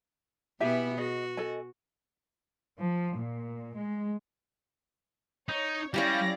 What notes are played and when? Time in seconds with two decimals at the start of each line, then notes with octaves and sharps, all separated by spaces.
0.60 B2 B3 E4 G4 E5 G#5
0.98 F#4 G#4 D#5
1.37 A4 D#5 G#5
2.79 F3
3.15 A#2
3.76 G#3
5.48 D#4 C#5
5.94 G3 C#4 E4 G4 D5 F5 A#6